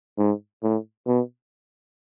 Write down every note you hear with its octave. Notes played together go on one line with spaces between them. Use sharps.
G#2
A2
B2